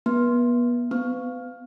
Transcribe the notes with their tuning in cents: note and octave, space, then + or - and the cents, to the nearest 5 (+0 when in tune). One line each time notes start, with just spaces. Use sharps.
B3 -35
B3 +40